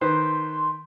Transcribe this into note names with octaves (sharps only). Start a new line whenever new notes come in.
D#3 B4 C5 C6